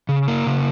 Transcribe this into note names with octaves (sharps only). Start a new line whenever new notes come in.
C#3
A#3
C#3